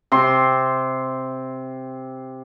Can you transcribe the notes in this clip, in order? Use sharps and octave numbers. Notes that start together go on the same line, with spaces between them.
C3 C6